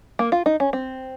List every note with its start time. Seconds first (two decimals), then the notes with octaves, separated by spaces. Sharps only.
0.19 A#3
0.32 F4
0.46 D#4
0.60 C#4
0.73 C4